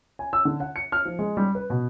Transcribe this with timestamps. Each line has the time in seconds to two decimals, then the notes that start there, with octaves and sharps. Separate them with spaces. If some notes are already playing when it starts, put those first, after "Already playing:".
0.19 G#5
0.33 E6
0.45 D3
0.60 F#5
0.76 C#7
0.92 F6
1.05 F3
1.19 G#3
1.37 G3
1.55 B4
1.70 B2